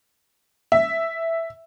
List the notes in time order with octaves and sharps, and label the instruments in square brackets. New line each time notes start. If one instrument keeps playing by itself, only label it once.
[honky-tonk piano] E5